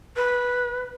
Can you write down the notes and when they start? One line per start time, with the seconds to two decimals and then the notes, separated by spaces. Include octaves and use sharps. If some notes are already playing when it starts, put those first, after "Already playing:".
0.16 B4